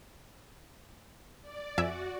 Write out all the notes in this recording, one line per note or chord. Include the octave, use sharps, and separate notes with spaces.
D5
F2 F#4 E5 G#5